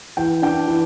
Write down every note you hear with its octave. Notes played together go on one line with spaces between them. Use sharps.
E3 G5
D4 G5
E3